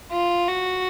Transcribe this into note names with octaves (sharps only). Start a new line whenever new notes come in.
F4
F#4